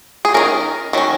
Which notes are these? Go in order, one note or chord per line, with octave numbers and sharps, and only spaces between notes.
G#4
D#3 F#3 C#4 A#4
D#3 F#3 C#4